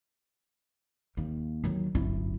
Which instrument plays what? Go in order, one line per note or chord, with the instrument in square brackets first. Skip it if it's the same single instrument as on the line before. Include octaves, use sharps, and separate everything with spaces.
[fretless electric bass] D#2 [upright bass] A#3
[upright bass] D#3 F#3
[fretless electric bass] D1 G1 F#2 [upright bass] E4